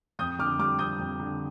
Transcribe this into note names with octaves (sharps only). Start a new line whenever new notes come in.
F2 D#6 G6
D3 D6 F6
G3 D6 F6
F2 D#6 G6
F2
D3